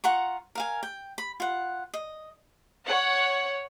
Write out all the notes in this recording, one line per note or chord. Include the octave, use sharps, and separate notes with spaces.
F4 F#5 A#5 C#6
A#4 F5 G#5
G5
B5
F4 F#5
D#5
C#5 F#5